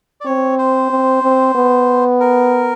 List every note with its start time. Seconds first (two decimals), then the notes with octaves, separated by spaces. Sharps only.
0.21 D5
0.26 C4 C#5
0.58 C5
0.90 C4
1.23 C4
1.55 B3
2.20 A#4